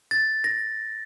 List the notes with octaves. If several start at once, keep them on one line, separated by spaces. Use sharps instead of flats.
A6
A#6